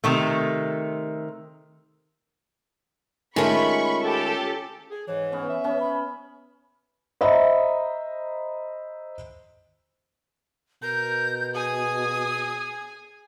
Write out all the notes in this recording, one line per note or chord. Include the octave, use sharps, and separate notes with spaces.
C3 D#3 A3
D#3 G#3 A3 C#4 F4 B5 C#6
G4 A4
G#4
G#2 E3 C#5
B3 C#4
E5
B3 C#4 C#5
B5
C5 D#5 E5 A#5 B5
B2 A#4 G6
G#4 G#5 D#6